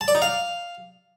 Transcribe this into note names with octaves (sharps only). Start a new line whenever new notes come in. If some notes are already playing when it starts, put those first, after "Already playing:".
A5
D5
D#4
F5